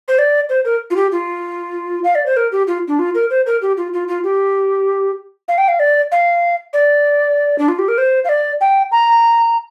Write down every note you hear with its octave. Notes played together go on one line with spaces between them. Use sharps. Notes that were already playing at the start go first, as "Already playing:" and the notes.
C5
D5
C5
A#4
F4
G4
F4
F5
D5
C5
A#4
G4
F4
D4
F4
A#4
C5
A#4
G4
F4
F4
F4
G4
F5
G5
F5
D5
F5
D5
D4
F4
G4
A#4
C5
F5
D5
G5
A#5